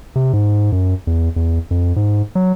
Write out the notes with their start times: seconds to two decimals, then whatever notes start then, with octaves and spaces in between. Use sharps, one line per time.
0.16 C3
0.33 G#2
0.72 F#2
1.07 E2
1.36 E2
1.71 F2
1.96 G#2
2.35 F#3